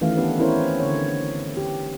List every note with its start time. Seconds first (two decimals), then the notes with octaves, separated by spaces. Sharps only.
0.01 D#3 E3 A3 C#4 F5
0.17 B3 D4 G4 A4 B4
0.38 C4 C#4 E4 A#4 C5 C#5
0.80 D3 C#5
1.57 G4